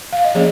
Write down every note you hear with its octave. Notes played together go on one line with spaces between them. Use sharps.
F5
D#5
F3 A#3 C#4 G#4 C#5